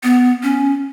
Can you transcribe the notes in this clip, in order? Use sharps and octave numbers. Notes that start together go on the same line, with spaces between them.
B3
C#4